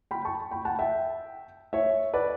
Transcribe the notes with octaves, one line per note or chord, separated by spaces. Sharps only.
G5 B5
A5 C#6
G5 B5
F#5 A5
E5 G5
C#5 E5
B4 D5